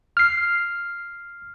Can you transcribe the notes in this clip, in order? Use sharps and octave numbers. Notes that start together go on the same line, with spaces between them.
F6 C7